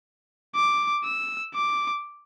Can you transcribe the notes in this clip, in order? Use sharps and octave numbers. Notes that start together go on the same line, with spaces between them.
D6
E6
D6